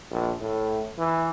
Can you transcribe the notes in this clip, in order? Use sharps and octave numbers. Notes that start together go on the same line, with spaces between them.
A#1
A2
E3